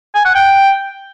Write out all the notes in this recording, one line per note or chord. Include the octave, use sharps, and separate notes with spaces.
G#5
F#5
G5